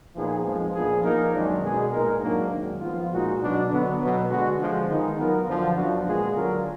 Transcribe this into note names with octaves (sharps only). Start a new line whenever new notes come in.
A#2 F3 B3 D#4 G#4
F2 F3 G#3
A#2 F3 B3 D4 G#4
F3 A#3 D#4 A#4
F#2 D#3 G#3 D4
B2 G#3 D#4 G#4
A#2 G#3 D#4 A#4
G#2 F#3 A#3 D4
F#2 D#3 G#3
F3 B3 F4
A#2 G#3 D#4 F#4
B2 F#3 D4
D3 F#3 B3
B2 F#3 B3
D3 G#3 D4 F#4
D3 F3 G#3
D#3 G#3 B3 D#4
F#3 B3 F4 A#4
F#2 D3 F3
F#2 F3 B3 D4 F#4
A#2 G#3 B3 F4 G#4
D3 F#3 D4 F4 A#4